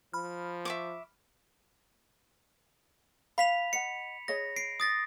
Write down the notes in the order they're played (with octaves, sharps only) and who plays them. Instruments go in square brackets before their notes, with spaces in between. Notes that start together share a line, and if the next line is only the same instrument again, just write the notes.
[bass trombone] F3 [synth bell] B5 F6
[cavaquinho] E5 C#6 D6
[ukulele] F5 [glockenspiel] B5 B6 F7
[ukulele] D#5 F#5 [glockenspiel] C#7
[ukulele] G#4 C#5 D#5 [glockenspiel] A#6
[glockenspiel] C7 D7
D#6 A6 A#6